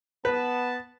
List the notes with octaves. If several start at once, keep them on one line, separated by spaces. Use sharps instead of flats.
B3 B4 A5